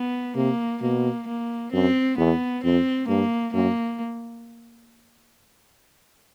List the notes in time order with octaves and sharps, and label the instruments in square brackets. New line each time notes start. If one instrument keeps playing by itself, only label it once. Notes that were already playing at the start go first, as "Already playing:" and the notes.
Already playing: [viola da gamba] B3
[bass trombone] C3 [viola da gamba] A#3
[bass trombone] B2 [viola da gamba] A#3
[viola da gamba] A#3
[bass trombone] F#2 [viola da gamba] C4
[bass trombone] E2 [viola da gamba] B3
[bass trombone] F2 [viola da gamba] C4
[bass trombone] G2 [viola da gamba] A#3
[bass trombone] F#2 [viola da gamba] A#3